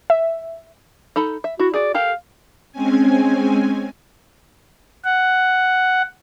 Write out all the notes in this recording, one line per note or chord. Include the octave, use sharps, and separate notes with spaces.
E5
D#4 A4 B5
E5
E4 F#4
F#4 G#4 D5
G4 A4 A#4 F5
G#3 C4 C#4 G#5
F#5